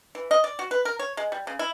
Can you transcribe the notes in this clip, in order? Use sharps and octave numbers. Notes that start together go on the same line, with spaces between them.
E3
D#5
D5
F#4
B4
A#4
C#5
G#3
G3
C#3
E4